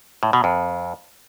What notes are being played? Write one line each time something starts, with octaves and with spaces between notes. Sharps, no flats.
A2
B2
F2